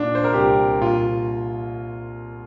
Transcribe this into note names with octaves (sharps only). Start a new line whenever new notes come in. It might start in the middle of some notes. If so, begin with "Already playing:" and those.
Already playing: A#2 D4
C5
A#4
C2 G4
A#2 F4